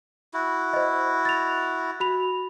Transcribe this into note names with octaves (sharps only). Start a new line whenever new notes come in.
E4 F#4
C5 D#5
A6 F7
F#4 B5 F7